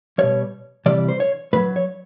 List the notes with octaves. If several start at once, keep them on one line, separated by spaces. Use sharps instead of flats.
B2 G3 C#5
C3 E3 G3 D5
C5
C#5
A2 B4
F#3
C#5